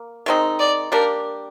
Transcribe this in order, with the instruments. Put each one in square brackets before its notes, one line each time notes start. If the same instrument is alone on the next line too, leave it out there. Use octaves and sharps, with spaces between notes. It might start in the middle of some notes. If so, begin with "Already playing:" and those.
Already playing: [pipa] A#3
D#3 G#3 C4 D#4
[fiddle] D5
[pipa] G3 A#3 D4 G4 [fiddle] A#4